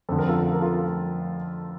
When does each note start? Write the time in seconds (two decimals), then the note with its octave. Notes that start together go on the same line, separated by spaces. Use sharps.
0.09 F2 D3 A4
0.19 A#4
0.29 F4 A4
0.53 A#4
0.61 F4 A4